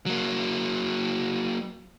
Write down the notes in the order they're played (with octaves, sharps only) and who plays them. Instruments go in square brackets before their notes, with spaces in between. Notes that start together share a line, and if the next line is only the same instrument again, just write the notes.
[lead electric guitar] F#3 A#3